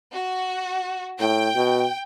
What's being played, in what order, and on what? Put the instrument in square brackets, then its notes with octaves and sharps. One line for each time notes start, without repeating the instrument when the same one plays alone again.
[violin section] F#4
[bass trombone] A2 [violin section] G5
[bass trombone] B2